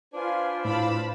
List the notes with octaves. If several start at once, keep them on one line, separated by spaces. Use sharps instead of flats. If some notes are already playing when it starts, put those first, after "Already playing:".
D4 F4 B4 C5 G#5
A2 A5 B5 E6